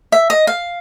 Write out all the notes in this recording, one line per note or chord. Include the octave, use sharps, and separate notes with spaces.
E5
D#5
F5